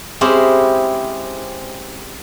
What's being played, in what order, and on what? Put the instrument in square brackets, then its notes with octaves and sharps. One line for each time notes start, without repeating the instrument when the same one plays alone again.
[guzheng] G#3 C4 C#4 E4 G4 G#4